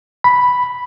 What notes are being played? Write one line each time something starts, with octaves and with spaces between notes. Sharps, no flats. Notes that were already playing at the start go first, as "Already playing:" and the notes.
B5